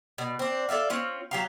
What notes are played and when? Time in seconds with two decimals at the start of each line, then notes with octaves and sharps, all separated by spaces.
0.18 B2
0.39 C4 D4
0.69 A4 D5 E5 F5
0.90 C4 C#4 F4
1.31 F#3 G4 F5